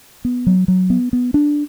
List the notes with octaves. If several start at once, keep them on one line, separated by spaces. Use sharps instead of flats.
B3
F#3
F#3
B3
B3
D4